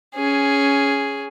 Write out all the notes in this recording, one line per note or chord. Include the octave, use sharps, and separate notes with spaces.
C#4 G#4